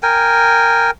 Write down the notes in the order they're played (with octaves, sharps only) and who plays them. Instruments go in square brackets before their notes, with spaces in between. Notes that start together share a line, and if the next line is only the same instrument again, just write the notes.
[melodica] A#4 G5 G#5